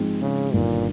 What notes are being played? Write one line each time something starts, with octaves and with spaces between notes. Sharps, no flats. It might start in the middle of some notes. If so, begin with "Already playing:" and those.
Already playing: G#2 F3 G#3 C4
C#3
G1 G2 A#2 D#3